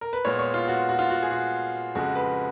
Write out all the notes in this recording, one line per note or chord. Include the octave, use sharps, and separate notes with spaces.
A#4
B4
A#2 G#3 B3 C#5
C#5
F4
F#4
F#4
F4
F#4
G#4
F#4
F2 C#3 G#3 F#4
B4